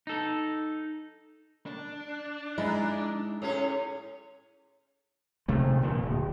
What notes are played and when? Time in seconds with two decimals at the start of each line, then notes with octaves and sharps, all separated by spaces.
0.07 D#4 A4
1.66 D4
2.58 G#3 D#4 E4
3.42 A2 C#4 G#4
5.48 C3 D#3 A3
5.82 A#2 D3 F3
6.02 D1